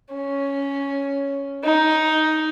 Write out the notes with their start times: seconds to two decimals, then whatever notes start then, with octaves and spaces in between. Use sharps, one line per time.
0.13 C#4
1.64 D#4